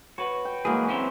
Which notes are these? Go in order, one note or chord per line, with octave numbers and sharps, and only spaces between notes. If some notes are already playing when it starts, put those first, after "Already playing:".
F#4 B4 C#5
G5
E3 F#3 G#3 A#3 G#4
C4 C#4 E4 C5